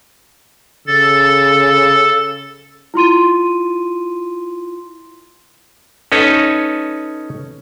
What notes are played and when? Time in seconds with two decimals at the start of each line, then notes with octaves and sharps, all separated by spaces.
0.87 C#3 A4 A6
2.94 E4 F4 C6 D#7
6.12 C#4 D#4 A4 B4 C#5